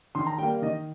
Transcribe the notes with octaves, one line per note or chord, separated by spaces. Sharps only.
D#3 C6
A#5
G3 A#3 G5
F5
D#3 D#5